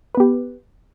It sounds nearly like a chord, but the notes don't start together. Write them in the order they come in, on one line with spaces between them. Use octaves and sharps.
B4 B3 G4